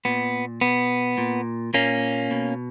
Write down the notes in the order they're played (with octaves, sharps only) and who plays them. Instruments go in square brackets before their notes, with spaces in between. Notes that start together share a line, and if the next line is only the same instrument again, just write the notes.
[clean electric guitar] A#2 B3
B2 B3
A#2
A#2 A#3 C#4
B2